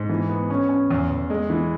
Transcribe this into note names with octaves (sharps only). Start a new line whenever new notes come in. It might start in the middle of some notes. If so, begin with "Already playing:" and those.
Already playing: G#2
E3
B3
C#4
C#4
E2
E2
G#3
E3